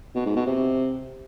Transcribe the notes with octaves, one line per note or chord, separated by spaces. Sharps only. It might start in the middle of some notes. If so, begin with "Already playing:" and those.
B2
G#2
B2
C3